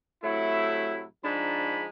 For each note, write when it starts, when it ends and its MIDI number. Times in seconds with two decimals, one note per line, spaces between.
0.23 1.04 45
0.23 1.04 48
0.23 1.04 54
0.23 1.04 57
0.23 1.04 64
1.24 1.88 44
1.24 1.88 53
1.24 1.88 56
1.24 1.88 62
1.24 1.88 82
1.24 1.88 83